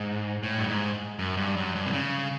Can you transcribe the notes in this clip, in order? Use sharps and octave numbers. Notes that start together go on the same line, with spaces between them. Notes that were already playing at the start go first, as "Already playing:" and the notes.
Already playing: G#2
A2
G2
G#2
F#2
G2
F#2
G2
C3
C#3